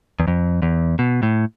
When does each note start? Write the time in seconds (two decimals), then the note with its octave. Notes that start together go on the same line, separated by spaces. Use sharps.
0.20 E2
0.28 F2
0.62 E2
0.99 B2
1.23 A2